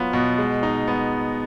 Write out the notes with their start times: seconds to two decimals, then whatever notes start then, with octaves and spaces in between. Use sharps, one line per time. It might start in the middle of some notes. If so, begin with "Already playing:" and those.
Already playing: F#3 B3 F4
0.13 B2
0.38 G#3
0.63 D#4
0.88 B3